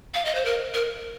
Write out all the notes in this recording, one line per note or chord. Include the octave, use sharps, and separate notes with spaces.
F5
D#5
C5
A#4
A#4